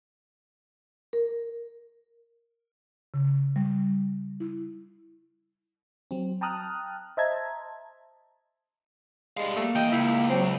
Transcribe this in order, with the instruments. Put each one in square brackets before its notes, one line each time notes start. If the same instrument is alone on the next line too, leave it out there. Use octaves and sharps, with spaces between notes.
[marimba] A#4
C#3
G3
E4
[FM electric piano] F#3 C4
G5 A5 A#5 D#6 F6 F#6
C5 D#5 E5 A5 A#5 G#6
[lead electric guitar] G3 F5 [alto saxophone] G#3
[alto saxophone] A3 [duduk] A#3
[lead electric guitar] E3 D#5 [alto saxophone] G5
[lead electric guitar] C#2 [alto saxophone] E4
[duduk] F#3 [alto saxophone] C4